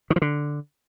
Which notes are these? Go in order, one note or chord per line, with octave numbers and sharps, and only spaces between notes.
D#3
F3
D3